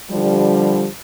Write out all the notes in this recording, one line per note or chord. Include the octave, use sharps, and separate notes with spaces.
D3 F3 G3